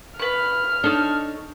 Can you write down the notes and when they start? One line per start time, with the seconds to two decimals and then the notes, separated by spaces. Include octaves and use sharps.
0.19 B4 C#6 F6
0.84 D4 D#4 A4 C#5